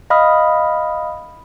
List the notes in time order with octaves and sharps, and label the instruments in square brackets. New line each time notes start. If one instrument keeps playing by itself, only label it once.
[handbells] D#5 F5 B5 D#6 F6